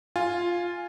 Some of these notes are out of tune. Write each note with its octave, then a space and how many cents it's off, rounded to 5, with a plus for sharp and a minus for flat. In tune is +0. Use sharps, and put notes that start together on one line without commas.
F4 +0 G#5 +0